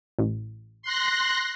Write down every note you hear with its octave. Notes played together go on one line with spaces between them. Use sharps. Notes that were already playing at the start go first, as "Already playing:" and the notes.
A1
C6 F#6 A#6